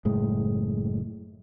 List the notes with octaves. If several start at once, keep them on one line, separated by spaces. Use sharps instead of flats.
F#1 A2 G#3